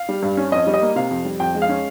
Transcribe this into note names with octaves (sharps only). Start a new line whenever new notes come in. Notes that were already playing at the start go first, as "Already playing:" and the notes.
Already playing: F5
G3
G2
C#4
F2 D#5
G3
D#5
A#3
C3 F5
F2
G3
F2 G5
G#3
F5
C#4